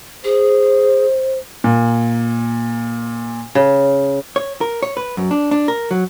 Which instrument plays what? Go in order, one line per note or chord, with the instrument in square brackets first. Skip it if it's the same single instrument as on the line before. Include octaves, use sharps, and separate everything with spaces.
[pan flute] G#4 [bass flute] C5
[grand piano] A#2
[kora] C#3
[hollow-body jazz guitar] C#5
A#4
C#5
B4
F#2
D4
D4
A#4
F#3